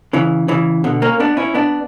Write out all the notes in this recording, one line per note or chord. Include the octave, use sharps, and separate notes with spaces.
C#3 E3
C#3 E3
B2 D3
A#3 C#4
B3 D4
C#4 E4
B3 D4